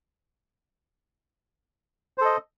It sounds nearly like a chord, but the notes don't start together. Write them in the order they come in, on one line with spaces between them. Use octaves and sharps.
C5 A4 D#5